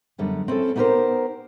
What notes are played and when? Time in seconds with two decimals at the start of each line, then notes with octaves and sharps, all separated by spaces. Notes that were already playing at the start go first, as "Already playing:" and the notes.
0.18 F#2 D3 G3 B3
0.48 C4 C#4 E4 A4
0.76 B3 D#4 G4 G#4 A#4 C5